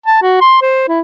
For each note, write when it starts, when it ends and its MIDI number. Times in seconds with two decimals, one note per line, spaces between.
0.06 0.18 81
0.22 0.37 66
0.41 0.60 84
0.62 0.86 72
0.88 1.00 64